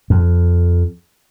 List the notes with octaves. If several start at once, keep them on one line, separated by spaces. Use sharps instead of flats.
F2